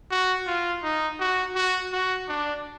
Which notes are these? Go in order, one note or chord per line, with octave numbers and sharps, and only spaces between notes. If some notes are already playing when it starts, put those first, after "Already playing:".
F#4
F4
D#4
F#4
F#4
F#4
D4